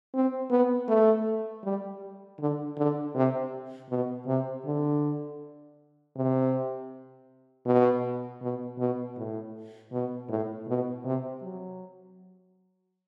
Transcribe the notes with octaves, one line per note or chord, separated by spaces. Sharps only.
C4
B3
A3
G3
D3
D3
C3
B2
C3
D3
C3
B2
B2
B2
A2
B2
A2
B2
C3
F#3